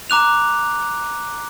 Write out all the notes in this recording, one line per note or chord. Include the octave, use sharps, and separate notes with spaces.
A#5 D6 F#6 F7